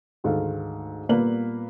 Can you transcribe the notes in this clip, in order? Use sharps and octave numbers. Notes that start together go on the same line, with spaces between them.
D2 G#2 D#3 A4 F5
A#2 G3 A#3 B3 B4 F#7